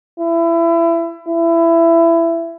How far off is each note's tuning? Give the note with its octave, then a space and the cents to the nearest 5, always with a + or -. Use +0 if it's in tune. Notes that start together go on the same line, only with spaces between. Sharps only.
E4 +25
E4 +20